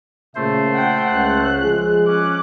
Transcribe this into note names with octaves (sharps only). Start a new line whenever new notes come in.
A#2 C#3 A3 C5
F#5 G5
C#2 F#6
F3 G#3 G#4
C#4 D6 F#6